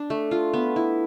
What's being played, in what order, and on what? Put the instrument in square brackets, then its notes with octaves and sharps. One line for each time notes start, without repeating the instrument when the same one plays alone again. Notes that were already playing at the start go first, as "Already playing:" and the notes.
Already playing: [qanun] D4
A3
F4
B3
E4